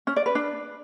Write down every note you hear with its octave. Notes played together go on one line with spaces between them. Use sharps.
C#4
D5
B4
D4